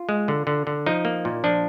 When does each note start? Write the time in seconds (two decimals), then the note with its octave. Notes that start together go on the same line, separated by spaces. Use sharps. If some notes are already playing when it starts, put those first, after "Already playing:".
Already playing: F4
0.09 G#3
0.28 D3
0.47 D3
0.67 D3
0.86 F3 D#4
1.05 A#3
1.25 A#2
1.44 F3 D4